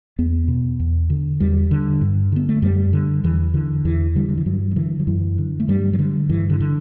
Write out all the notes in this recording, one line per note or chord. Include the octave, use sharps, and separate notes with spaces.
E2 B3
B2
E2
D3
E2 G3
D3
G2
D3 B3
A3
F#2 G3
D3
E2 E3
D3 E3
E2 E3
D3 G3
D3
E3
G2 F#3
F#3
D3 E3
F#3
F#2 E3
D3
A3
G2 G3
F#3
D3 G3
G2 E3
D3
D3